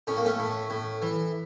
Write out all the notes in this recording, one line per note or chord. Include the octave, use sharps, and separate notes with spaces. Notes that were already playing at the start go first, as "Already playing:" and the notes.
A2 C#4
A#3
A3 C#4
A2
A2
E3